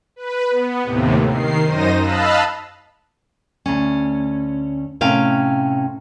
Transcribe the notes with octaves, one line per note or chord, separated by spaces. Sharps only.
B4
B3
D#2 A2 C3
D#3 C7
F#2 D#4 C5 A#6 D#7
D#5 F5 A5 B5 E6 F#6
D2 C#4
A2 C3 C#4 F5 G5